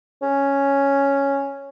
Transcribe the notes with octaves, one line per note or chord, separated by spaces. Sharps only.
C#4